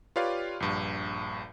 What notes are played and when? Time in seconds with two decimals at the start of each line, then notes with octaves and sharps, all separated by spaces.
0.16 F4 G4 B4 C#5 D5 F5
0.60 A#1 G2